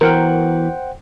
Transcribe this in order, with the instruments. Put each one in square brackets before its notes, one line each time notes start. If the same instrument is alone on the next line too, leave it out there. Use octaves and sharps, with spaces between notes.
[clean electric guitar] E3 B3 F#4 [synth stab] A#4 [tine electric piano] C5 F#5 G5